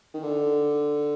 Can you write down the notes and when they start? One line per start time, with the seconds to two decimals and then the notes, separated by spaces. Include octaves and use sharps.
0.14 D#3
0.23 D3